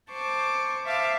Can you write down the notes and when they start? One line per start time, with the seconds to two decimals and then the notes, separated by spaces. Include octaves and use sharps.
0.11 C5 A5 C#6 D6
0.85 C5 E5 F5 A5 D6